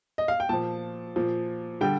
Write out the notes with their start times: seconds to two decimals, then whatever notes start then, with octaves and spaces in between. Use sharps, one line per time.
0.18 D#5
0.28 F5
0.40 G5
0.49 A#2 F3 A5
1.16 A#2 F3
1.81 D3 G3 G5